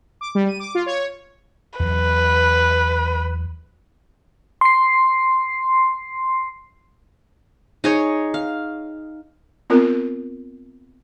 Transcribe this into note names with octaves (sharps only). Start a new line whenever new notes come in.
D6
G3
D#7
D6
F4
C#5
E2 F#3 B4
C6 C7
D#4 G#4 C#5
F5
B3 C4 F4 A#4